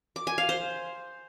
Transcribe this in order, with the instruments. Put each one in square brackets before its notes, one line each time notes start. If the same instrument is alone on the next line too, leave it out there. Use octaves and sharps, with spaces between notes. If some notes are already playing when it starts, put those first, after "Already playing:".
[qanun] D6
G#5
F5
C5